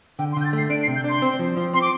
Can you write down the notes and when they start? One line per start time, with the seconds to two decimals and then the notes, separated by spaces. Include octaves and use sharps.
0.19 D3 G5
0.32 C6
0.36 D3 G6
0.45 A6
0.53 A3 C7
0.70 D4 D7
0.83 C7
0.88 C3
0.96 G6
1.04 D4 C6
1.22 C4
1.39 F3
1.57 F3
1.73 C4 C6
1.81 D6